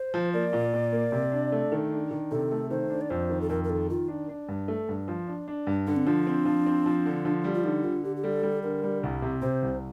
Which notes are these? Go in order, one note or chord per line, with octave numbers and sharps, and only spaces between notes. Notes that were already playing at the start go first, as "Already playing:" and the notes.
Already playing: C5
F3
A#3 D5
A#2
A#2
A#3
C3
D4
A3
D#3
D4
D#3
C3 A4
A3
D#3 C5
D4
D5
F2 C5
D#3
A4
F2 A#4
A#4
D#3 A4
D#3 F4
D4
D4
G2
A3
G2
F3
D4
D4
G2
D3 D4
C4
F3 D4
C4
F3
C4
F3
D3
F3
G3
F4
D3 D#4
D3 F4
D3 G4
G4
G3 A4
G3
D3 A#4
G3
C2
C3
C3 C5
C2